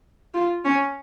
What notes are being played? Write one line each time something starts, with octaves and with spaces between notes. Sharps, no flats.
F4
C#4